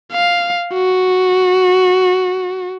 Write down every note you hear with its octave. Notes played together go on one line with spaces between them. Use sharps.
F5
F#4